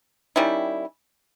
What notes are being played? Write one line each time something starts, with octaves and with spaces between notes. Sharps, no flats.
D#3 G3 C#4 E4